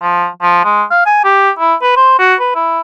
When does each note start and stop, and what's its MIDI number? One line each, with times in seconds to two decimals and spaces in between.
0.02 0.27 53
0.42 0.63 53
0.64 0.83 56
0.91 1.05 77
1.06 1.21 80
1.24 1.50 67
1.59 1.75 64
1.82 1.95 71
1.96 2.17 72
2.19 2.35 66
2.40 2.50 71
2.55 2.80 64